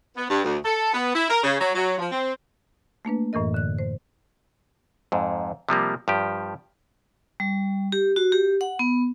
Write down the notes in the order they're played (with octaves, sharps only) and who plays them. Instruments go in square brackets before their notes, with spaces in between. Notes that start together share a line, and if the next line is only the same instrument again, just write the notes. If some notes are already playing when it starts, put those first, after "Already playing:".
[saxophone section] B3
G2
D2
A4
B3
E4
A#4
C#3
F#3
F#3
F3
C4
[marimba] A3 A#3 D4 B4
F#2 A2 E3 A#4 D#5
D3 F#6
C5
[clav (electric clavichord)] F2 G#2
C3 F3 G3 A#3
G2 F3 G4
[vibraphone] G3
G4
F#4
G4
F#5
B3